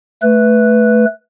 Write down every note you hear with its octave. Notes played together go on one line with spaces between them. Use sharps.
A3 B4